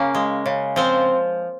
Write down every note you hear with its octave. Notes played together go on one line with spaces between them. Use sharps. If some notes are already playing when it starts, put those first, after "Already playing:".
Already playing: C#3 A#3 C#4
G#3
C#3
F3 C4